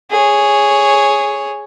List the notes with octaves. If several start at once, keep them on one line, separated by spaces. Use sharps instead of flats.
G#4 C#5